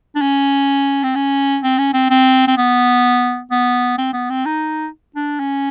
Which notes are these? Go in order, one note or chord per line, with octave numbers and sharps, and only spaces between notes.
D4
C#4
C4
C#4
C4
C#4
C4
C4
C4
B3
B3
C4
B3
C4
D#4
D4
C#4